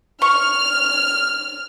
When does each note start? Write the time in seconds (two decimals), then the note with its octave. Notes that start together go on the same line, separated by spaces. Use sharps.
0.22 C#6 F6